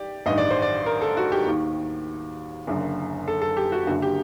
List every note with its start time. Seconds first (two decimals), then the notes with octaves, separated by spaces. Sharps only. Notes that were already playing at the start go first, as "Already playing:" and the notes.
Already playing: G4 D5
0.26 A1 G2 D#3 D#5
0.38 D5
0.50 C5
0.62 D5
0.86 A#4
1.02 A4
1.17 F#4
1.32 G4
1.46 D#2 D#3
2.67 F#1 F#2 D3
3.28 A4
3.42 A4
3.57 G4
3.72 F#4
3.87 F#1 F#2 D3 F#4
4.02 G4